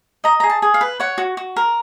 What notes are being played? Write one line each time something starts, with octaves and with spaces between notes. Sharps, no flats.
D#5 A#5
G#4 A#5
A5
G#4
F5
B4
C#5 F#5
F#4
F#4
A#4